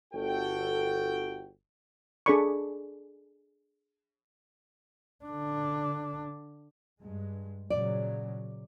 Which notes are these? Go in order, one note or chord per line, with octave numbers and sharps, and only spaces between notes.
G1 F#4 A4 G5
D4 G#4 A4 D5 B5 C#6
D3 D4
G2 G#3
A#2 C#3 F#3 D5